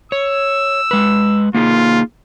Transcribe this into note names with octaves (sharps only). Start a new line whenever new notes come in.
C#5 E6
G#3 B4
A#3 D#4 F4 G#4